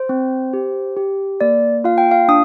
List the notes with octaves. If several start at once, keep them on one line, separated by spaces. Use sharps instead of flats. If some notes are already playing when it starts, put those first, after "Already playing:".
Already playing: C5
C4
G4
G4
A#3 D5
F4 F5
G5
F5
D4 D#6